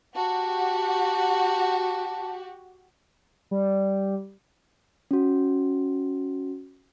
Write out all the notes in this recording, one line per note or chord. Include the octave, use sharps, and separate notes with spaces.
F#4 G4 A5
G3
C#4 F#4